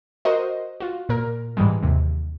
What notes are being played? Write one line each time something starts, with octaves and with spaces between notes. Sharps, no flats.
F#4 A#4 C5 D#5
F4 F#4
A#2 A#4
G#2 E3 G3 G#3
D#2 C3